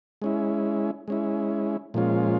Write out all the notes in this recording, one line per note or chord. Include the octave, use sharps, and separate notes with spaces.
G#3 C#4 E4
G#3 C#4 E4
A#2 F3 G#3 C#4 F4